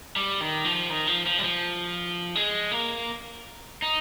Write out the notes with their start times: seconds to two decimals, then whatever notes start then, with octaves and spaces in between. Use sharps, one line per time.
0.16 G3
0.41 D#3
0.65 F3
0.90 D#3
1.07 F3
1.26 F3
1.39 G3
1.44 F3
2.35 G#3
2.72 A#3
3.82 D#4